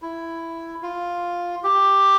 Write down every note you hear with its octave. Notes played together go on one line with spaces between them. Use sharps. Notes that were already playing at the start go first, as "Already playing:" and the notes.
E4
F4
G4